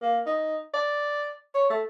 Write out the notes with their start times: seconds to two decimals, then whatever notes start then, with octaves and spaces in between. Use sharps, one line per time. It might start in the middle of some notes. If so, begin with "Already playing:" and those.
0.02 A#3
0.26 D#4
0.74 D5
1.55 C#5
1.70 A3